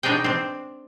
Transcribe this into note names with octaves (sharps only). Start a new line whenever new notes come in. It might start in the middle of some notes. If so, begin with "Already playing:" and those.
B2 D4 D#4 G#4 G5
C4 D4